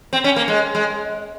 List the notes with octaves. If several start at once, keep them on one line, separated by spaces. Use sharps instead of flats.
C4
C#4
A#3
G#3
G#3